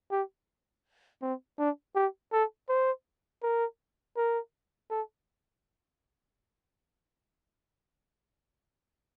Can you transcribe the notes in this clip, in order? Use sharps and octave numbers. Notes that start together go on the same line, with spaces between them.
G4
C4
D4
G4
A4
C5
A#4
A#4
A4